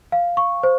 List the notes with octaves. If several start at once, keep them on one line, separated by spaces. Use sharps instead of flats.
F5
C#6
C5